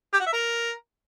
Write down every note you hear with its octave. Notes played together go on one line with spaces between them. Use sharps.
G4
F#4
E5
A#4